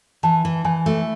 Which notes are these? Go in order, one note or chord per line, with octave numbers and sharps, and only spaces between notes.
E3 A5
E3
E3 G#5
A3